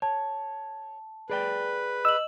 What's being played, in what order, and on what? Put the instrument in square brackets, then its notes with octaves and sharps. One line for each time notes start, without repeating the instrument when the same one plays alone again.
[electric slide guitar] C#5 [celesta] A5
[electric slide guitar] G#4 D5 G5 [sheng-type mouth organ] B4
[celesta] D#5 F#7 [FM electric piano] E6